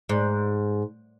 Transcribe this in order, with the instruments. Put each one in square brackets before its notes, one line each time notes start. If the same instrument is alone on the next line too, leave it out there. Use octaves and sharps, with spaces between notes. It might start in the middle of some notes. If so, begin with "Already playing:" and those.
[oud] G#2